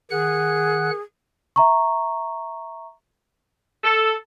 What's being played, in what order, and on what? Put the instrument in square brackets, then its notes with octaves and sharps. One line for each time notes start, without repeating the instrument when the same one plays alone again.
[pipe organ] D#3 F#5 F#6 [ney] G#4
[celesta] E5 A#5 C#6
[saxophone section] A4